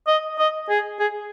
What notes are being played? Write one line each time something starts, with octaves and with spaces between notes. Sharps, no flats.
D#5
D#5
G#4
G#4